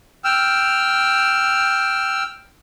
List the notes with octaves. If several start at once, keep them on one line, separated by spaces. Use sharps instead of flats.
G5 E6 F6